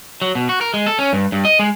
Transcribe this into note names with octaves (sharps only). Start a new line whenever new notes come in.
F#3
B2
F#4
A#4
G#3
A4
C#4
G2
G2
D#5
G#3